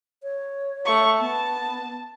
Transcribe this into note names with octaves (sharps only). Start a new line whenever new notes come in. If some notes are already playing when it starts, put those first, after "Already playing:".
C#5
A3 C#6
B3 A5